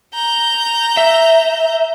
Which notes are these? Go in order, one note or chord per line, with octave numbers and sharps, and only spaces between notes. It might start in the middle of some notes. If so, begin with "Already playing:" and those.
A#5 G6
E5